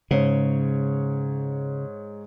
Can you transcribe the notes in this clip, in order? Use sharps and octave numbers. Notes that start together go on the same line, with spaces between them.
G#2 C#3 C#5